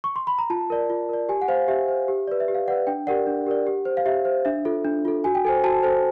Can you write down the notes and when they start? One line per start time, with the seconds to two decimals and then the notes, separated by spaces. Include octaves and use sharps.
0.04 C#6
0.16 C6
0.27 B5
0.39 A#5
0.50 F4 A5
0.70 A#4 D5
0.90 F4
1.09 A#4 D5
1.29 G4 G#5
1.42 F#5
1.48 C5 F5
1.68 G4 E5
1.88 C5
2.08 G4
2.28 B4 D5
2.40 E5
2.48 G4
2.54 F5
2.68 B4 D5 F#5
2.87 D4 G5
3.07 G4 A#4 D5 F#5
3.27 D4
3.47 G4 A#4 D5
3.67 G4
3.85 C5
3.97 F5
4.06 G4 E5
4.25 C5
4.45 D4 E5
4.65 F4 A4
4.85 D4
5.05 F4 A4
5.24 F#4 G#5
5.35 G5
5.45 A4 C5 G#5
5.64 F#4 A5
5.83 A4 C5